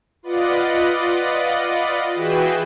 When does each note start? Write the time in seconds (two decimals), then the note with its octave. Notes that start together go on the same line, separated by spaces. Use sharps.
0.23 F4 B4 D5 D#5 F#5
2.15 E3 F#4 G#4 B4 G5 E7